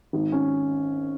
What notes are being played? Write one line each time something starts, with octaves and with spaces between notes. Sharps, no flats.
G#1
C#4